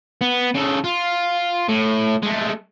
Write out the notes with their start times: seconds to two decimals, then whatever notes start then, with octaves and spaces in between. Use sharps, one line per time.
0.21 B3
0.54 C#3 A4
0.84 F4
1.68 A2
2.23 G#3 A3